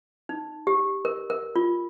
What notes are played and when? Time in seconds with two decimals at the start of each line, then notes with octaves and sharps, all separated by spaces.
0.29 D#4
0.67 G4
1.05 A#4
1.30 A#4
1.56 F4